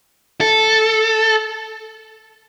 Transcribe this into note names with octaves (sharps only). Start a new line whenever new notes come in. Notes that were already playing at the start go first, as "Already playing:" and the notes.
A4